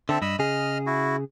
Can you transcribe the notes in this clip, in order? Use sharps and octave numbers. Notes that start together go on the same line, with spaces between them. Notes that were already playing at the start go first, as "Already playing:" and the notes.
D3 C4 A4 E5
G2 D#5 B5 E6
C#3 G#4 D#5 F6
E4 F#4